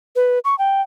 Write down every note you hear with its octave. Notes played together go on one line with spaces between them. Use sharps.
B4
C#6
G5